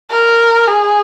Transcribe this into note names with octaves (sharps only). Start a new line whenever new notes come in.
A#4
G#4